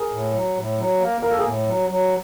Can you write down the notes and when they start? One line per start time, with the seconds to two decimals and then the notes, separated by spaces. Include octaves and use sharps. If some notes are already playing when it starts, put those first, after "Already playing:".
Already playing: G#4 A#4
0.11 A2
0.33 F#3
0.56 A2
0.78 F#3
1.00 A#3
1.21 A#3 A#4
1.31 A4
1.38 G#4 A#4
1.45 A2
1.66 F#3
1.89 F#3